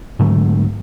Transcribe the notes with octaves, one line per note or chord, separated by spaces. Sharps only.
G#2 D3 F#3 A3